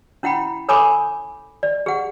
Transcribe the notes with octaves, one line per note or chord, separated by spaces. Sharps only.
C#4 E4 F#5 G5 B5
A4 A#4 C#5 G#5 B5 D6
D5
G#4 F#5